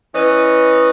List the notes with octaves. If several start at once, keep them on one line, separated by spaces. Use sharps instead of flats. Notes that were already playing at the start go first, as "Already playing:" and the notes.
E3 C#4 B4 D#5